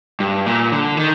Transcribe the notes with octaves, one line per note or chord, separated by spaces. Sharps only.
G2
A#2
D3
D#3